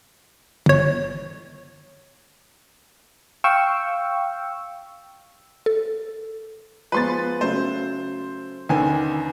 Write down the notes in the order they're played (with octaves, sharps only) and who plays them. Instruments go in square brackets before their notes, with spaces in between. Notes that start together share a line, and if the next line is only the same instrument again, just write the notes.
[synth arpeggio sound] G1 C#5
[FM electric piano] F5 G5 C#6 E6
[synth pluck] A4
[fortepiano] F3 G#3 B3 [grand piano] B4 C6 A6
[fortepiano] C#3 F#3 A3 [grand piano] C5
[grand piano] D#2 D3 G#5 [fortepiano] D#3 C#4 B4